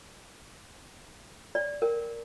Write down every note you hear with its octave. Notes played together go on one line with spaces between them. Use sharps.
D5
A#4